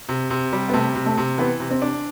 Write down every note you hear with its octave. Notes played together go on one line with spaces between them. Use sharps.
C3
C3
G3
B3
C3 A3
C3
A3
C3
E3 B3
C3
C4
D4